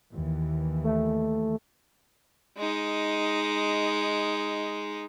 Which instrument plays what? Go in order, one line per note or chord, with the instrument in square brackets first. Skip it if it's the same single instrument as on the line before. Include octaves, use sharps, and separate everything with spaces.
[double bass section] D#2 E3
[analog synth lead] A3
[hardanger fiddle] G#3 D#4